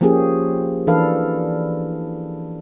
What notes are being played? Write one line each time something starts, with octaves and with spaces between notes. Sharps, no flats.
F3 A#3 C#4 G4 G#4
E3 D4 A4 B4 F5